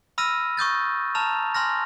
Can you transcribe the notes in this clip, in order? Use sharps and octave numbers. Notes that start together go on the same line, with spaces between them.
B5 E6 F6 A#6 D#7
C#6 D#6 G6 A6
A5 A#5 F6 F7
G#5 C6 F6 A#6